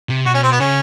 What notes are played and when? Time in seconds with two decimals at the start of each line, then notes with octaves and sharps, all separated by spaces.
0.09 C3
0.26 B2 F#4
0.34 C#4
0.43 C4
0.52 B3
0.60 C#3 C#4